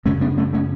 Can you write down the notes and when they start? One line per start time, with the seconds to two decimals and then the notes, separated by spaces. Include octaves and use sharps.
0.05 F#2 C#3 A3 C#4
0.21 B3 D4
0.37 A3 C#4
0.53 A3 C#4